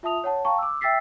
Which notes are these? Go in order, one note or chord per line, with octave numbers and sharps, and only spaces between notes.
F4 E5 A5 D#6 F7
C#5 F#5 A5
F5 G5 A5 A#5 C#6
D6 E6
E5 G5 E6 A6 B6 C7